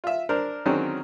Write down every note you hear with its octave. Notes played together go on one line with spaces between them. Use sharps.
F4 E5
D4 A#4 C5 A#5
D3 D#3 F#3 G#3 C4 C#4